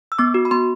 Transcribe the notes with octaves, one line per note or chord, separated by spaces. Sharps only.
E6
B3 D6
F#4
B5
B3 C6